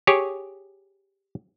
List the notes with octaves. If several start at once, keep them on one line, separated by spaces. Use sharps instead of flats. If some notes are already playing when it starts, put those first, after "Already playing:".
G4 G#4 C#5